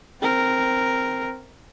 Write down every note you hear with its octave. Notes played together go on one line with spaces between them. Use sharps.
C4 A#4